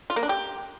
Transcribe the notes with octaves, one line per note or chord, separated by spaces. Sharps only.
F4
A#3
D4
G4